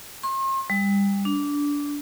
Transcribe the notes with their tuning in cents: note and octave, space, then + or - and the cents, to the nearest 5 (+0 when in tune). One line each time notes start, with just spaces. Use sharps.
C6 +40
G3 +25
D4 -20